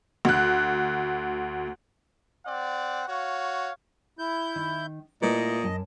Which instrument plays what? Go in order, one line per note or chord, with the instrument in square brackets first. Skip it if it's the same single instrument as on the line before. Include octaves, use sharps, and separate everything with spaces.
[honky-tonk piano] D2 F#6
[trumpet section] C4 D5 F#5
F#4 C#5 F5
[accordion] E4 G6
[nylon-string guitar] D#3
[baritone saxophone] A#2 [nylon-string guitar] A3 E4 B4 [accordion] D#5
[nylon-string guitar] F#2 A5